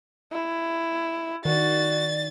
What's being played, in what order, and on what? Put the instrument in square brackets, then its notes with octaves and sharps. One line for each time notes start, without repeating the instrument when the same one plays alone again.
[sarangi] E4
[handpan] D#3 [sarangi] F#4 [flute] D5 [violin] A6